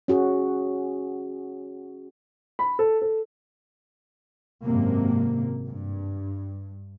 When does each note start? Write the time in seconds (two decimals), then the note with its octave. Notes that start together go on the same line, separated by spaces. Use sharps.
0.08 C#4 F#4 G#4
2.59 B5
2.79 A4
3.02 A4
4.63 G#1 F#2 C3 A#3
5.67 G2